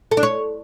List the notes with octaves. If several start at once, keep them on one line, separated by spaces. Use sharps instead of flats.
A4
D4
C#5